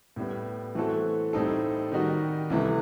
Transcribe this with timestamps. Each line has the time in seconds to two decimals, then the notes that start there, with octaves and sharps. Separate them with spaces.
0.16 A2 G3 B3
0.75 E3 A3 C4 F#4 A4
1.33 A2 G3 C4 D#4 A4
1.92 D#3 G3 D#4 F#4
2.50 C2 C3 E3 A3